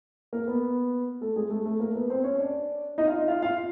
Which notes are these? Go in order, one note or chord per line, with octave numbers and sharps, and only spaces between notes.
A#3 A#4
B3 B4
A3 A4
G#3 G#4
A3 A4
A3 A4
A#3 A#4
B3 B4
C4 C5
C#4 C#5
D4 D5
D#4 D#5
F4 F5
F4 F5
F4 F5